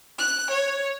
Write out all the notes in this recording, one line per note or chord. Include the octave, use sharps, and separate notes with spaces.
F#6
C#5